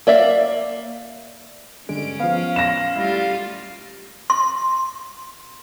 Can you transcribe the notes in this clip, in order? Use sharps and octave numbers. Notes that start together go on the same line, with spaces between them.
A#3 D5 E5
G2 D3 G#3 C#4 D7
F3 B3 F5
A#6 E7
G3 A3 E4 F4
C6